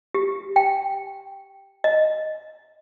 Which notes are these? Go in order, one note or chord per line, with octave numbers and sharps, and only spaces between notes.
G4
G5
D#5